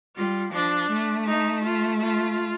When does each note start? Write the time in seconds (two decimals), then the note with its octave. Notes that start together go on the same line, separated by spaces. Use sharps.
0.16 G3 F4
0.52 F3 D4
0.89 A3
1.27 D#4
1.64 F4
2.01 F4